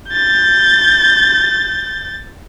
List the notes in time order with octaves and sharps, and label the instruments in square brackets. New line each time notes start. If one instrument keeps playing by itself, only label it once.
[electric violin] G6 A6